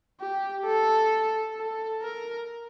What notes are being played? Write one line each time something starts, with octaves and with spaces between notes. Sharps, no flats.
G4
A4
A4
A#4